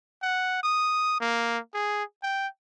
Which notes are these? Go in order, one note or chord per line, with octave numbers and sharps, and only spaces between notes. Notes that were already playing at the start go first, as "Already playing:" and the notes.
F#5
D#6
A#3
G#4
G5